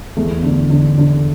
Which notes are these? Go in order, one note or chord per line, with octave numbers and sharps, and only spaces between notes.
E2 A3
D3
D3
D3